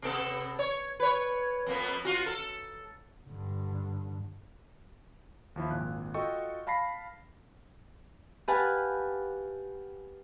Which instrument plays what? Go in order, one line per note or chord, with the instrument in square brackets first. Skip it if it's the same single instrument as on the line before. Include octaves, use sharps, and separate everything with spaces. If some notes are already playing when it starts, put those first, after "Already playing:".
[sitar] C3 B3 A4
C#5
B4 C#5
F2 A#3 B3
F4 F#4
A4
[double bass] G2 D3
[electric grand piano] D#2 F3 E4
G#1 A#2 F#6
F4 F#4 A4 D#5 G5 C#6
F5 A5 B5 A#6 C7
[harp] G4 B4 F5 F#5 G#5 A5